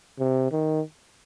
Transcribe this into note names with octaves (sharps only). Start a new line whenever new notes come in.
C3
D#3